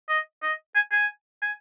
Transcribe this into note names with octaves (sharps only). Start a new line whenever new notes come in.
D#5
D#5
G#5
G#5
G#5